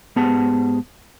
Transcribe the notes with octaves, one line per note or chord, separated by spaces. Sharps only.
G#2 B3 G4 G#4 F#5 A5